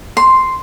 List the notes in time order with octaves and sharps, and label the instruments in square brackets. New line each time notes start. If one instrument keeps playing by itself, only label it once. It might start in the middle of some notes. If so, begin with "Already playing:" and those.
[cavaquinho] C6